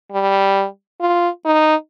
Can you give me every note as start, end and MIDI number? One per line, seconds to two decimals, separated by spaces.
0.12 0.65 55
1.00 1.29 65
1.45 1.75 63